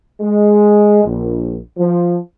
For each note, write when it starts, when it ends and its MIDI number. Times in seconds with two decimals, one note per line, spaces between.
0.21 1.03 56
1.04 1.57 34
1.78 2.17 53